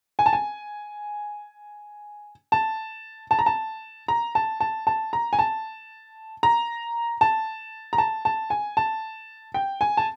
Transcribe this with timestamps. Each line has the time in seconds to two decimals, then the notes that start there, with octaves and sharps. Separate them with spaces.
0.19 G#5
0.26 A5
0.33 G#5
2.52 A5
3.31 A5
3.39 A#5
3.46 A5
4.08 A#5
4.35 A5
4.60 A5
4.87 A5
5.13 A#5
5.33 G#5
5.39 A5
6.43 A#5
7.21 A5
7.93 A#5
7.98 A5
8.25 A5
8.50 G#5
8.77 A5
9.54 G5
9.81 G#5
9.97 A5